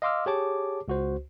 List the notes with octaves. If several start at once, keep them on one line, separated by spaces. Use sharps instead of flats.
D#5 F5 C6 D6 E6 F6
G4 G#4 C#5 A5 D6
C#2 F#4 C5